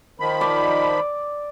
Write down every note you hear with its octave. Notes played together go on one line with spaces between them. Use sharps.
D#3 F3 B5
D5